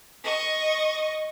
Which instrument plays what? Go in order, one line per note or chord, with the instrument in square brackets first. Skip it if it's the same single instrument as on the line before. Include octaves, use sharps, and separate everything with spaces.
[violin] D#5 C#6